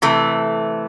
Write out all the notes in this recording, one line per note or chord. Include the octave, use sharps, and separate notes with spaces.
C3 E3 A3